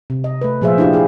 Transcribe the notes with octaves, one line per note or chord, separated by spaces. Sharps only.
C3
D#5
A3 B4
A#2 F3 G#4 C5 E5 F5
D4 E4 F4 G4
F4 G#4 F5